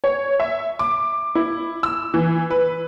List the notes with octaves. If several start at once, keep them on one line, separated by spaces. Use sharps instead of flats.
C#5
E5
D6
E4
E6
E3
B4